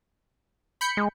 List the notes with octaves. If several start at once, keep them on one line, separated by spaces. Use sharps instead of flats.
B5 G6 C#7
G#3